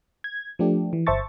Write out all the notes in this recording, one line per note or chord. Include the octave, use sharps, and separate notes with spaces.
G#6
F3 A3 D4 G4
E3
G1 C5 E5 A5 C#6 A6